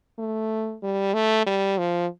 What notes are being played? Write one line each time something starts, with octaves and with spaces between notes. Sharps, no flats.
A3
G3
A3
G3
F3